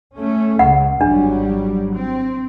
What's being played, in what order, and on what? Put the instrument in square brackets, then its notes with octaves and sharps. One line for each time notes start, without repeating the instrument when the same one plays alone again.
[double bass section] A3 C#4
[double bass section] C#2 [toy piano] F#5
[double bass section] G#1 F#3 G3 [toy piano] D4
[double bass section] C4